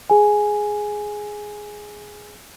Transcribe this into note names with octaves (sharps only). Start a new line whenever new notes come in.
G#4 G#5